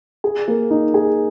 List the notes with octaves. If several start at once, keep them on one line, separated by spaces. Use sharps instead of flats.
G#4
A#3
D#4
G#4